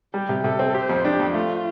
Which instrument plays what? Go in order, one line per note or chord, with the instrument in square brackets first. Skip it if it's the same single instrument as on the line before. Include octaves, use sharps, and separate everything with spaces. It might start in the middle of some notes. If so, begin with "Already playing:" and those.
[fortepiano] G3 [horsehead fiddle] G4
[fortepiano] C3
[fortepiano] C3 [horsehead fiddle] A4
[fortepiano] C4
[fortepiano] G4 [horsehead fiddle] C5
[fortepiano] F2
[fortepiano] D4 [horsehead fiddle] G4
[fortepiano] F2
[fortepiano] A3 [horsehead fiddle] F4